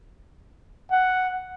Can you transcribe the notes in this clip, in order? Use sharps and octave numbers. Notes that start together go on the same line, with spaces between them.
F#5